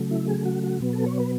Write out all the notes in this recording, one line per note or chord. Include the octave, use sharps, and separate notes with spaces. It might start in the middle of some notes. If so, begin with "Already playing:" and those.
Already playing: C#3 F#3 A3
E4
G#4
F#4
F#4
B2 F#3 B3
A4
C#5
B4